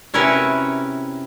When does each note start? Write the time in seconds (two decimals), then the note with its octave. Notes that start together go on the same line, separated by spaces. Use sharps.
0.14 C3 C#4 E4 F#4 A#4 B4